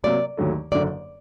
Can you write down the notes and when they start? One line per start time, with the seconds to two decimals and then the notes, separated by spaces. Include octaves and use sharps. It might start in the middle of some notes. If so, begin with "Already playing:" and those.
0.04 C3 F#3 A#3 D5
0.37 D#2 D3 F#3 A3
0.72 F#1 F#2 D3 D5